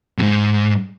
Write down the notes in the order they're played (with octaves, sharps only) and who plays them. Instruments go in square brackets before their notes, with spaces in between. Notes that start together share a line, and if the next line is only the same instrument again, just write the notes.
[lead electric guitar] F2 G#2